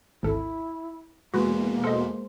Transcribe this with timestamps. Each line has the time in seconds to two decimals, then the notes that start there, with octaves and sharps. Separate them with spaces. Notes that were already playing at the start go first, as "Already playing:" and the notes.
0.23 G#1 D2 E4 A4
1.34 E2 B2 E3 G#3 A#3 F#4 B4
1.84 A4 C5 D#5